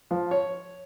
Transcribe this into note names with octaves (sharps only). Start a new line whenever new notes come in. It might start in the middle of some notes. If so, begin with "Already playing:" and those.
F3
C#5